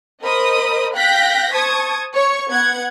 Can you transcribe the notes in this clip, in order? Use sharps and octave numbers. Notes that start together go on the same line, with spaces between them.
A#4 C5 D#5 B5 D#6
F5 G5 F#6 G6 A#6 B6
C5 A5 C#6 D#6 G#6
C#5 C#6
B3 F#5 G#6